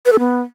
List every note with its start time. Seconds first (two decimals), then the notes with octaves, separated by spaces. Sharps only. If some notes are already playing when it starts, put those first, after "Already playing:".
0.06 B4
0.12 A4
0.19 B3